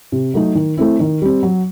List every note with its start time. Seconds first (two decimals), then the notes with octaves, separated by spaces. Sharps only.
0.12 C3
0.34 F#3 A3 D#4
0.55 D#3
0.77 A3 C4 E4
1.00 D#3
1.22 G3 C4
1.43 F#3